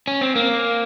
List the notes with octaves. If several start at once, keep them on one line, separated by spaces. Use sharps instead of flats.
C#4
C4
A#3